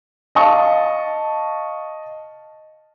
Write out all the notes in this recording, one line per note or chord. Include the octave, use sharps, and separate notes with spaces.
D#5 F5 A5 C#6